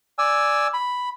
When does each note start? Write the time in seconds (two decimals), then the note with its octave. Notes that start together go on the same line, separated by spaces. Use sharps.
0.18 D5 G#5 E6
0.74 B5